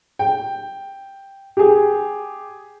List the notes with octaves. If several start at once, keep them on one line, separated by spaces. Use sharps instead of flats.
G5
G4 G#4